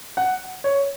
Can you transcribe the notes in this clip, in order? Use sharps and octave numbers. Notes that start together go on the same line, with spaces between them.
F#5
C#5